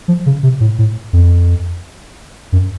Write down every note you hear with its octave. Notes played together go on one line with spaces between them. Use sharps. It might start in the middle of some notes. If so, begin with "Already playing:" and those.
F3
C#3
C3
A2
A2
F2
F#2